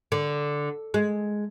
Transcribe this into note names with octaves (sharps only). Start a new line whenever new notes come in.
D3
G#3